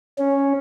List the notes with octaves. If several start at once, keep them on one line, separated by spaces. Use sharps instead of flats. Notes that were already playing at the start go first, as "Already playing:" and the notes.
C#4